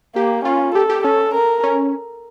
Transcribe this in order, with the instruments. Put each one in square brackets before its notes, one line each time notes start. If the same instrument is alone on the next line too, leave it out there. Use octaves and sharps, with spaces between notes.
[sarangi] A#3 [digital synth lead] G4
[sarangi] C#4 [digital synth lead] F4
[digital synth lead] G4 [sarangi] A4
[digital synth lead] G4
[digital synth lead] C#4 [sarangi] A4
[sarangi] A#4
[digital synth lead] C#4